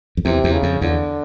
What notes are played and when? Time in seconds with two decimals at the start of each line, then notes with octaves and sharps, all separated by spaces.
0.17 F2
0.25 E2 C3
0.44 E2
0.53 C#3
0.63 F2
0.81 E2 D3